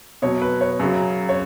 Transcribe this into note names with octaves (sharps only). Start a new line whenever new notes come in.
B2 F#3 C#5
B4
C#5
F#2 C#3 F#3
C#5